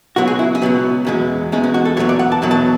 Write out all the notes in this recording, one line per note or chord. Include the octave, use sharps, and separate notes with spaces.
C#2 B2 F#3 F#4
G#4
E4
C#4
C#2 B2 F#3 B3
E2 B2 G#3 C#4
E2 B2 G#3 C#4
C#4
F#4
A4
E2 B2 F#3 B3 C#5
D5
F#5
A5
E2 B2 F#3 B3
A5